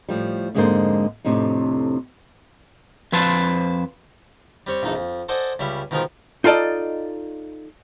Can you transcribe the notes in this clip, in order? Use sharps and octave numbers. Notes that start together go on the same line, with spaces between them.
A2 F3 G3
F2 G#2 D3 G#3 A#3 C5
F2 A2 C3 D4 D#4
F2 F3 B4 C5 A5
G3 C4 C#5 C#6
A#1 E2 D#4 A4 A5
F2
A4 C5 D5 D#5 F#5 G#5
C#2 G3 C#4 E5 B5
B2 D#3 F3 G#3 D#4 A#4
D#4 F4 A4 D5 D#5